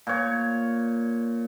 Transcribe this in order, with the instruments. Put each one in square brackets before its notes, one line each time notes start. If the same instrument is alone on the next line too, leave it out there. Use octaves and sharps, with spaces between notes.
[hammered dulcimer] A#2 C#5